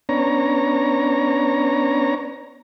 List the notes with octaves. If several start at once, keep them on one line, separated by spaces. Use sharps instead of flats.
B3 C#4 D4 C#5 A#5